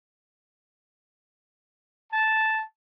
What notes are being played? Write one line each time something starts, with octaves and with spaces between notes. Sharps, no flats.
A5